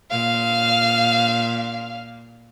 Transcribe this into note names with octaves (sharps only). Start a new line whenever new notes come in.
A#2 F5